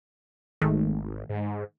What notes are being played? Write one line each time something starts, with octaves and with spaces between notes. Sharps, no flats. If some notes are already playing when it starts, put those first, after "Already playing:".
G#1 D#3 G#3 A3
G#2